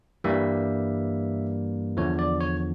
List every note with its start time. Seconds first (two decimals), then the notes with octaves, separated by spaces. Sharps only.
0.24 G2 E3 G3 A#3 E5
1.97 E2 D3 F3 C#5
2.19 D5
2.40 C#5